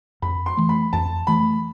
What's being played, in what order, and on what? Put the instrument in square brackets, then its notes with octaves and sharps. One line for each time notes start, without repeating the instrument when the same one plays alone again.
[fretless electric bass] F2 [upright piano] B5
[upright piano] C6
[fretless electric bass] E3 A3
[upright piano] B5
[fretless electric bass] F2 [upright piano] A5
[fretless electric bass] E3 A3 [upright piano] B5